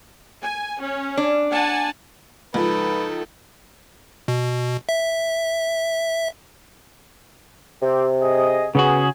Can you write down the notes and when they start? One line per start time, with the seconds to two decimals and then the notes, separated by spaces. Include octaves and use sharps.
0.43 G#5
0.81 C#4
1.17 D4
1.51 F#5 G#5 A5
2.54 C#2 F3 D#4 A4 B4
4.28 B2
4.89 E5
7.82 C3 C4 G4
8.21 G#4 D#5
8.75 C#3 B3 C#4 F#4 G#4